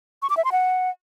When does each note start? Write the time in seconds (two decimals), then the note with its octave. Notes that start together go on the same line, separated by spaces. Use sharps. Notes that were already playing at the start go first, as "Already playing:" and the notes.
0.22 C#6
0.30 D6
0.37 E5
0.45 C6
0.52 F#5